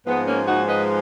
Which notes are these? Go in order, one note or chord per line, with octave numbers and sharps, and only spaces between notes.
G#2 F3 G#3 B3
A#3 C#4
D#4 F#4
B4 D#5